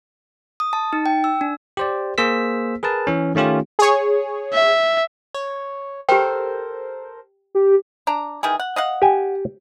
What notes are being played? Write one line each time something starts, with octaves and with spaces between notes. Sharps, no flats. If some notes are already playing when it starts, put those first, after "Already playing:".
D#6
A5
D#4
G5
E6
D4
G4 C5 D5
A#3 G#4 C5 E6 B6
G#4 A#4 B4 A5
E3 C#4
D#3 A3 C#4 F4 G4
G#4 C#5
E5
C#5
G4 A4 A#4 C5 G5
G4
D4 A#5
D#3 E3 G#4
F#5
D#5 F5 F#5
G4 G#5